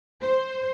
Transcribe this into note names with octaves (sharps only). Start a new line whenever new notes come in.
C5